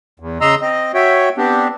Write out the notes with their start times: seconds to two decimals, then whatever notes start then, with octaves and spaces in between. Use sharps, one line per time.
0.20 E2
0.41 C#3 D#5 A#5 C6 E6
0.62 C4 D#5
0.94 F#4 C#5 E5 G5
1.37 B3 C4 D4 G4